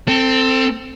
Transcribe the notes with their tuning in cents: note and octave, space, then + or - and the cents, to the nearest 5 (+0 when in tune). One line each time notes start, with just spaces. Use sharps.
C4 +0 A4 +25